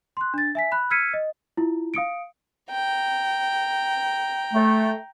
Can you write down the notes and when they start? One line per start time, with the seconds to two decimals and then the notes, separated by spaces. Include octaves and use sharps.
0.17 C6 F#6
0.34 D4 A6
0.55 E5 G#5 B6
0.72 B5 F#6
0.90 E6 F6 G#6 B6 C#7 D#7
1.13 D#5
1.57 E4 F4
1.94 F5 D#6 C#7 D7
2.71 G5 A#5
4.54 A3